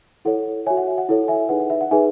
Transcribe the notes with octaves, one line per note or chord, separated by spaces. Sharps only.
E4 A4 C#5 F#5
F#4 C#5 E5 G#5
F#5
E5
F#5
E4 A4 C#5 F#5
E5 G#5
D#4 G#4 B4 F#5
F#5
E5
F#5
D#4 G#4 B4 E5 G#5